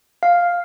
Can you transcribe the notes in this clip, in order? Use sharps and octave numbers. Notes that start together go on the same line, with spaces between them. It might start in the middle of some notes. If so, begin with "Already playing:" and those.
F5